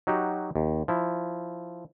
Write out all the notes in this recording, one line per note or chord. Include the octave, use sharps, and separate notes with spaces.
F#3 D#4 F#4 G4
D#2
F3 E4